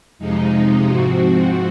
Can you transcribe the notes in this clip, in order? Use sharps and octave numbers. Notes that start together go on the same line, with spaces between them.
F2 C3 F3 G#3 D#4
G#2 F3 C4 F#4